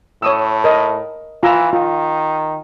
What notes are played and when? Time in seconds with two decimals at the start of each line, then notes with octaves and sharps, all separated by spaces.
0.22 A2 C#5 D#6 E6
0.64 A#4 D#5
1.43 E3 F4 A#5 E6
1.73 D#3 F4